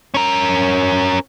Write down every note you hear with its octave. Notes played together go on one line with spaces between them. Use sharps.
C#4 A#4